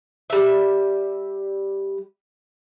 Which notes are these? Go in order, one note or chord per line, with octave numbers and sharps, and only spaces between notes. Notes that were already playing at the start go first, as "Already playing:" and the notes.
G3 E5